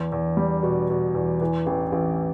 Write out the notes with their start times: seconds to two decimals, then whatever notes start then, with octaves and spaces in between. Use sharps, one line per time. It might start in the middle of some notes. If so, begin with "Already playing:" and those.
Already playing: E2
0.12 E2
0.37 G3
0.63 B2
0.90 B2
1.15 E2
1.41 E3
1.66 A1
1.92 A1